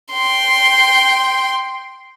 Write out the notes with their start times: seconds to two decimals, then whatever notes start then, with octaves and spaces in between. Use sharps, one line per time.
0.12 G5 C6